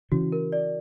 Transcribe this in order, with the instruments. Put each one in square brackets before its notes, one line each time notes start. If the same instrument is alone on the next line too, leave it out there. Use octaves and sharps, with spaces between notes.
[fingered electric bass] C#3 E3 [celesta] F#4
[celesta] A#4
D5